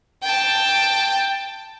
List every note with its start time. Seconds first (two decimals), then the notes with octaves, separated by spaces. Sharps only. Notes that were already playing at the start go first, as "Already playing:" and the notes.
0.23 G5 A5